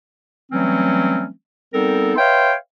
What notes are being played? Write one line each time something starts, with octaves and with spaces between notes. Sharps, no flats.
E3 F#3 G3 A3 C4 C#4
G3 B3 C4 D#4 A4 A#4
B4 C#5 E5 F5 G5 C6